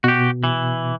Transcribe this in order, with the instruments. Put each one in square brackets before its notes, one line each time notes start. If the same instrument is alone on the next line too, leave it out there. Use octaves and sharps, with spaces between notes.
[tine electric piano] B2 [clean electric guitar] F#4 G4
[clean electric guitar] E3